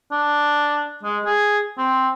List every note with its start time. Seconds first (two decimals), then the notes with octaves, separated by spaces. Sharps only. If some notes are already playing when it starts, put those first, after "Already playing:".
0.12 D4
1.04 G#3
1.26 G#4
1.78 C4